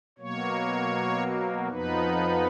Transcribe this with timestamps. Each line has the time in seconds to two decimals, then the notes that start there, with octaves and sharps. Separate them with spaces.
0.18 B2 F#3 A#3 C#5
1.69 F2 F3 B3 D#4 B4